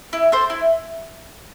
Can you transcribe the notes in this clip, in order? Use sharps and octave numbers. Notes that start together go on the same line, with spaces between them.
E4
A4 C5
E4